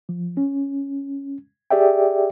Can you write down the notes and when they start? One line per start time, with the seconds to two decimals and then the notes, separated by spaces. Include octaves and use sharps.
0.09 F3
0.37 C#4
1.71 G4 G#4 D5 E5 G5